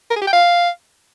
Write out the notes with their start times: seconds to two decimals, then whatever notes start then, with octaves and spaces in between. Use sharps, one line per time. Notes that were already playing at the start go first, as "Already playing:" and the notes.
0.10 A#4
0.16 G#4
0.22 G4
0.27 G5
0.33 F5